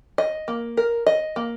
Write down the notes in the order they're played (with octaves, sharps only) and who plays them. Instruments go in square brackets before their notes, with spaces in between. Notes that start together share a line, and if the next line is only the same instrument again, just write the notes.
[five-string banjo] D#5
A#3
A#4
D#5
A#3